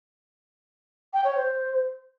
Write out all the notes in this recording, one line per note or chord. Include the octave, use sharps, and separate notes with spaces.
G5
C#5
C5